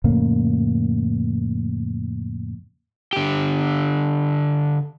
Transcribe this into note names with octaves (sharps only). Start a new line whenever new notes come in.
F2 A2 C#3 A#3
D3 G4